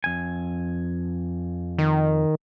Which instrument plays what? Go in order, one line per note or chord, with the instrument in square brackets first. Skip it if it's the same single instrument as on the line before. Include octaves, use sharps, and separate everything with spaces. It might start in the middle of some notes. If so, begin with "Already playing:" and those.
[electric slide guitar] F2 G#5
[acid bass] D#3